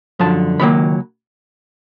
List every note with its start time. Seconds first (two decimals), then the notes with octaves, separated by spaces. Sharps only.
0.19 F#2 D3 F3 A5
0.59 C#2 C3 D#3 F#3 A#3 B5